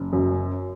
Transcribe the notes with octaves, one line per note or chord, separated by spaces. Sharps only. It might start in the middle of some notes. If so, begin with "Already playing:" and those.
Already playing: F#1
F#2